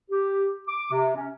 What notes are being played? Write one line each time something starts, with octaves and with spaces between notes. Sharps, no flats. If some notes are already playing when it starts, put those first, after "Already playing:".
G4
D6
C3
C#4